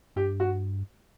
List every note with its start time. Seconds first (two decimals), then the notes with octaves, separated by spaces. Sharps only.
0.16 G2 G4
0.40 F#4